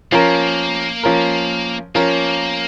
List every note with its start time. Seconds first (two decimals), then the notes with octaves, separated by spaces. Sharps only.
0.12 F3 A#3 C#4 A#4
1.03 F3 C#4 A#4
1.95 F3 A#3 C#4 A#4